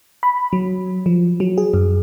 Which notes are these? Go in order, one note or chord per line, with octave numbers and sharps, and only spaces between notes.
B5
F#3
F3
F#3
G#4
F#2